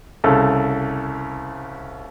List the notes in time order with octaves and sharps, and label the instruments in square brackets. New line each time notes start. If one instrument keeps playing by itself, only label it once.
[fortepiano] C2 C#3 A4